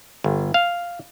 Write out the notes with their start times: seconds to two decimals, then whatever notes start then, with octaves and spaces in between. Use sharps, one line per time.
0.24 G1
0.54 F5